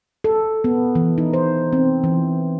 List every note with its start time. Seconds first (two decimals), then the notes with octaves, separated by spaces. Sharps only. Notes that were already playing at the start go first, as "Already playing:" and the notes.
0.24 A4
0.64 B3
0.95 E3
1.18 D#4
1.33 C5
1.73 C4
2.04 E3